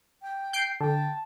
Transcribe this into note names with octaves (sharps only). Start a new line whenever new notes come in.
G5
G6 C7 D7
D3 G5 A5